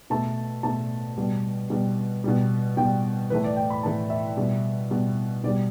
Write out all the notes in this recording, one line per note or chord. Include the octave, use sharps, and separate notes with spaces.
B2 A3 A5
B2 A3 A5
B2 G3
B2 G3
B2 G3
B2 G3 G5
A2 E3 A3 B4
D5
G5
B5
A2 E3 A3 A5
E5
B2 G3
B2 G3
B2 G3 D5